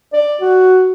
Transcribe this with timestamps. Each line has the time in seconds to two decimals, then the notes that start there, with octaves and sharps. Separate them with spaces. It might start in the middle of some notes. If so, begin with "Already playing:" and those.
0.13 D5
0.41 F#4